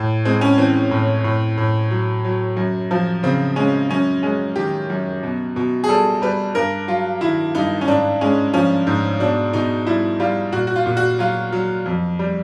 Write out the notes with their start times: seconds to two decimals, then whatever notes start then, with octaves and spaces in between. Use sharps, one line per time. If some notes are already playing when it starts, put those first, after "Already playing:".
Already playing: A2
0.25 G#3 C4
0.41 C#4
0.58 E3 C4
0.91 A2
1.24 A2
1.58 A2
1.91 F#3
2.25 F#3
2.57 F#2
2.91 F3
3.23 C#3 C4
3.56 G#3 C#4
3.89 F#2 C#4
4.23 G#3 C#4
4.56 D#3 G4
4.90 F#2
5.23 B2
5.56 B2
5.84 G#4
5.89 G3 A4
6.22 G3 B4
6.55 G2 A#4
6.88 F#3 F4
7.21 D#3 E4
7.55 G2 D#4
7.81 C#4
7.87 G#2 D4
8.21 G#3 C#4
8.54 F3 C#4
8.87 G#2
9.20 B2 D4
9.53 B2 D#4
9.86 G3 E4
10.20 G3 F4
10.52 A#2 F#4
10.67 F#4
10.76 F4
10.86 A#2
10.97 F#4
11.19 F#3 F4
11.52 F#3
11.86 F2
12.19 G3